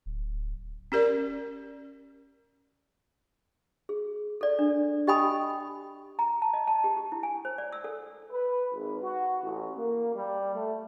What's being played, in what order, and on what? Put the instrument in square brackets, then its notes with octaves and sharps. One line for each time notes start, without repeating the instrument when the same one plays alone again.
[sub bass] D1
[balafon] C#4 G4 A#4 D5
[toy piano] G#4
A4 D5
D4
G4 D#5 G5 G#5 B5 D#6
A#5
A5
D#5
A5
G4
G4
E4
G#5
C5
D5
E6
A4
[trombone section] B4
G#1
F#4
A1
A#3
G3
A3